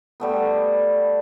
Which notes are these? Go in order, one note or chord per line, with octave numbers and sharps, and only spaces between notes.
G3 A3 B3